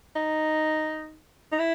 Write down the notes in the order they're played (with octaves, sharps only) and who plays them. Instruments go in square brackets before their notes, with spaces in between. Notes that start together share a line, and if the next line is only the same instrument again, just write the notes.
[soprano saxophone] D#4
D#4
E4